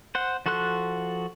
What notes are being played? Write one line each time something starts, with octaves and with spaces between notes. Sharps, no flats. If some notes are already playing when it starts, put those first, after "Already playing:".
C5 F#5
F3 F#4 A4 C6 F#6